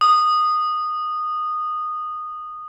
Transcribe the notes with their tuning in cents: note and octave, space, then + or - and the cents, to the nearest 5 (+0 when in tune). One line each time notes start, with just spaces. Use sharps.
D#6 -15